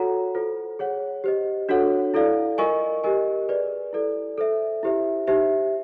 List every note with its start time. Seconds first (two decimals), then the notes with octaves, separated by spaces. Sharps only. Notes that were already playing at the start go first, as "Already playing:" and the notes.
Already playing: F#4 A4 C#5 F#5 A#5
0.35 F4 A4 C5
0.79 G#4 C#5 F#5
1.24 G4 C5 D#5
1.69 D4 F#4 A4 C#5 F#5
2.14 E4 A4 D5 F5
2.58 F4 A#4 D#5 G#5 C#6
3.04 G4 A#4 D#5 G#5
3.48 G#4 B4 D5
3.93 E4 A4 D5
4.38 A4 C5 E5
4.83 E4 G4 C5 E5
5.27 D#4 G4 C5 E5